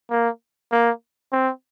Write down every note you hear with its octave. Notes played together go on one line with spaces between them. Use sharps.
A#3
A#3
C4